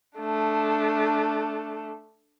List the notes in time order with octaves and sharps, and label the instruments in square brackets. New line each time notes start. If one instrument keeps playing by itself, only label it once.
[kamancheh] A3 D4